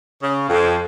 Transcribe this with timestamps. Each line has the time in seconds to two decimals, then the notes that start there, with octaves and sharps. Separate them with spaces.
0.23 C#3
0.49 F2